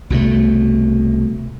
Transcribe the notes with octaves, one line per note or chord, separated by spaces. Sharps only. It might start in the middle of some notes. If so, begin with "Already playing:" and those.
C2 B2 F#3 A3